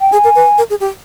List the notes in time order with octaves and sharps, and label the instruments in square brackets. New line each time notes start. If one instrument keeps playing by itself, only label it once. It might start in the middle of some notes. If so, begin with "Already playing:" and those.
[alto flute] G5
[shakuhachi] G#4 [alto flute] G#5
[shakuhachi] A#4
B4
A#4
G#4
G4